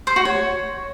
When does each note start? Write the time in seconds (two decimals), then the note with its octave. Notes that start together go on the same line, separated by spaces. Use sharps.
0.07 C5
0.16 F#4
0.25 C#5